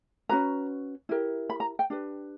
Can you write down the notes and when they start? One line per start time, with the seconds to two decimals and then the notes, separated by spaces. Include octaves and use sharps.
0.29 C#4 F#4 B4 A#5
1.09 E4 G4 A#4
1.50 B5
1.60 A#5
1.79 G5
1.90 D4 G4 B4